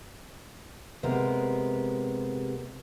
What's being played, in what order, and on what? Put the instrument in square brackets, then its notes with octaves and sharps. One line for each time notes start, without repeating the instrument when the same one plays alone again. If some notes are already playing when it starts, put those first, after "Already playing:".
[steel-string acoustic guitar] C3 G#3 B3 G4 A#4